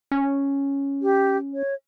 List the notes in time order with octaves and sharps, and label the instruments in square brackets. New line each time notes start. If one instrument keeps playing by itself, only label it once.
[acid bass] C#4
[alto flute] G4
C#5